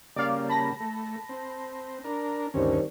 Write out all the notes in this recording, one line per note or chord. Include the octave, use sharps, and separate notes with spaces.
C#3 G3 A#3 D5 F5
A5 B5 A#6
A3
C4
D4 A#4
D2 G2 D#3 G3 C4 C#4